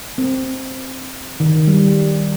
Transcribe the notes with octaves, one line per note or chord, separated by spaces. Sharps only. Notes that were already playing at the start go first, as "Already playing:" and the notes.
C4
D#3
G3